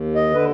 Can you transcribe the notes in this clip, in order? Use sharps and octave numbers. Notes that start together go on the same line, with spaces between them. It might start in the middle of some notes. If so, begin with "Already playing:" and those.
Already playing: D#2
D#5
D3 B4